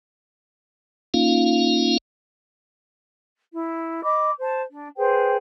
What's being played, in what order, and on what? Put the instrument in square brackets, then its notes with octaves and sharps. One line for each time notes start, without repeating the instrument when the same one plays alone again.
[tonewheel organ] A#3 C#4 D#4 F4 F5
[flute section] E4
D#5 B5 D6
C5 A5
D4
G#4 B4 C5 G5